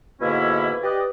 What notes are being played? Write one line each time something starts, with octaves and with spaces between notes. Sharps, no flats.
G#2 B2 D3 A#3 C#4 E4
G4 B4 D5 D#5